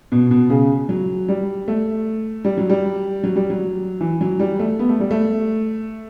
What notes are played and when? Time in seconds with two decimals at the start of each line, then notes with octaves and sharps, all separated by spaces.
0.12 B2
0.31 B2
0.50 C#3
0.89 F#3
1.28 G3
1.68 A3
2.45 G3
2.58 F#3
2.70 G3
3.24 F#3
3.36 G3
3.50 F#3
4.01 E3
4.21 F#3
4.40 G3
4.59 A3
4.79 B3
4.89 A3
5.00 G3
5.11 A3